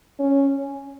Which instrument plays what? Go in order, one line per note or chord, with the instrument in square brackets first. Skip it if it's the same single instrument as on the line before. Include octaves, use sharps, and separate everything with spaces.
[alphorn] C#4